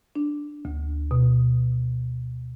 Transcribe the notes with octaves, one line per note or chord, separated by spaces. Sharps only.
D4
D2
B2